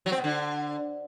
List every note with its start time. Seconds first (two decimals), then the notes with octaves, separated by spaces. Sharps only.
0.06 F#3
0.12 C4
0.18 B2
0.24 D3